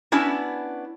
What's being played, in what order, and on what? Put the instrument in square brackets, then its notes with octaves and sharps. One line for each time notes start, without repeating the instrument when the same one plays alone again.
[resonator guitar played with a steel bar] B3 C#4 D4 E4 F#4